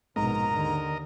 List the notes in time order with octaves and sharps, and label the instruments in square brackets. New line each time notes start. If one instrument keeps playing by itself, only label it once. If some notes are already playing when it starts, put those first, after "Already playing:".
[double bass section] A#1 B2 B3 [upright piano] G#2 [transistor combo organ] A#4 D#5 [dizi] A#5
[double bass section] D#2 D3 D#3